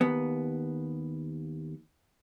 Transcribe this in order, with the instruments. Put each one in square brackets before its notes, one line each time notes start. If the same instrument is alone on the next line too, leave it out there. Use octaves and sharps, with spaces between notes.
[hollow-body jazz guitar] D#2 B3